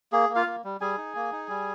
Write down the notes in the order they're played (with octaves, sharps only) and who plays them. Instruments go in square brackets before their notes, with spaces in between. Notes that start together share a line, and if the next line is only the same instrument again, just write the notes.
[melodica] A#3 G#4
A#3
F4 F5
A#3
G3
G3 G#4 G#5
D#4
A#3
D#4
G3